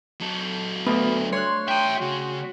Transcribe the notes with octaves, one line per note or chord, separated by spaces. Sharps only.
F#3 A4
D2 B3
C#5 C6 F#6
E5 G5 A#5
C#3 F#4